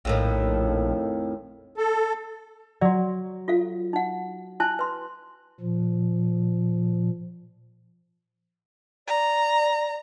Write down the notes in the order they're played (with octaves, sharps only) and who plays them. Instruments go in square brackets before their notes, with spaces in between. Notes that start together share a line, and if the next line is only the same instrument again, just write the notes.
[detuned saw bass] A#1 [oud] F2 A2 D#3
[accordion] A4
[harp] F#3 [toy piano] F#4 D5
[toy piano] F4 A4 F5
D#4 F#5
[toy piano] E4 G#5 A5 [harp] F#6
[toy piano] B4 C6
[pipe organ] A#2 F3
[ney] D5 [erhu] A#5